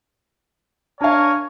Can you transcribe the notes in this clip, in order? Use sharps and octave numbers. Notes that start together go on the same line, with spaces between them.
D4 A#4 C#5 F5 G#5